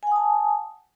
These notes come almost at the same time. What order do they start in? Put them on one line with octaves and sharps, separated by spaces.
G#5 F#5 D#6 A5